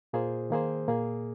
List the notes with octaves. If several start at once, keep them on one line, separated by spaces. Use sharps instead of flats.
A#2 A#3 F4 G#4 C5
D#3 A#3 G#4 C5
A#2 A#3 G#4